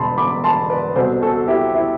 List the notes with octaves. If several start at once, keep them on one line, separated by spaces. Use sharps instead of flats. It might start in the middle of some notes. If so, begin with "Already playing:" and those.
Already playing: E1 E2 D3 A5 B5 C6
B5 D6
A5 C6
B4 D5
C2 B2 A4 C5
F#4 A4
E4 G4
E4